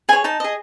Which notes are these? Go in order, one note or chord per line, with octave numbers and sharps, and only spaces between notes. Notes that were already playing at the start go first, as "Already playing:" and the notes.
G#4 C#5 G#5
D#4 A5
G#4 D#5